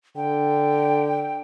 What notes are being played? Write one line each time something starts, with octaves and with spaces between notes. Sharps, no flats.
D3 G5